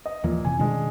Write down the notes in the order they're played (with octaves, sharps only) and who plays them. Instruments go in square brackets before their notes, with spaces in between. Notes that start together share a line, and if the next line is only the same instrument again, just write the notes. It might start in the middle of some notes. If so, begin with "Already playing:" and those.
[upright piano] D#5
[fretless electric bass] D#2 E3 F3 [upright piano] A#2
[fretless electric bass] F1 C3 E3 [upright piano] G#5
[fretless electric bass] B2 D#3 C#4 [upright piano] G#3 D4